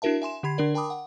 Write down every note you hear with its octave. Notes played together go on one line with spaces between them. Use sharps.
D4 E4 F#4 A#4 E5 A5
E5 G#5 C6 E7
D3 G4 B5 G#6 C7
D3 D4 A#4 D5
A#4 G5 A5 B5 D6 D#6
F#5